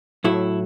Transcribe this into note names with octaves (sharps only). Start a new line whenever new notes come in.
A2 F#3 A3 E4